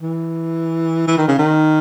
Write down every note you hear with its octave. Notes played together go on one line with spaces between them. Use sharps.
E3
E3
D#3
C#3
D#3